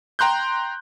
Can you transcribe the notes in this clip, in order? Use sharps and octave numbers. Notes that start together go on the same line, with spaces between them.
G5 A#5 C6 F#6 G6